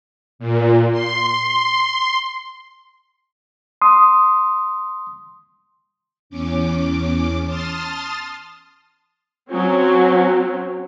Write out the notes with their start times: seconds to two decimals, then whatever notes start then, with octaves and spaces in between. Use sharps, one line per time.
0.39 A#2
0.92 C6
3.82 C6 D#6
6.30 E2 C#4 D6
7.45 A5 C6 D#6 F6 A6
9.51 F#3 C4 C#4